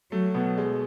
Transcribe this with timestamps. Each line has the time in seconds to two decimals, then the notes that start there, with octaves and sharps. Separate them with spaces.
0.12 F#3 A3
0.34 B2 B3
0.58 G#3